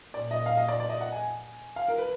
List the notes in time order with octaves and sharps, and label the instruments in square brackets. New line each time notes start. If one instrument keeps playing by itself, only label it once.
[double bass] A#2 [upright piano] D5
[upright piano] D#5
F5
D#5
D5
D5
D#5
F#5
G#5
F5
A#4
B4